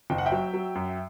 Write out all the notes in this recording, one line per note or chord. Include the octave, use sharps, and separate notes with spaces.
F#1 G5
F#5
E5 G5
F#3
F#3
F#2